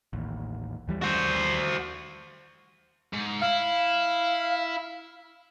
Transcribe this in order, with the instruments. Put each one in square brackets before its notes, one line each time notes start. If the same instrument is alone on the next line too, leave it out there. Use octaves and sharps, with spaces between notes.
[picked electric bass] A1 D#2
D#2 E3 G3
[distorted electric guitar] F#4 C5
G#2
[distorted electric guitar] E4 [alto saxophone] F5